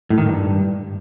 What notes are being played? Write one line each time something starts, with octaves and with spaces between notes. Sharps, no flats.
A2
D#3
G2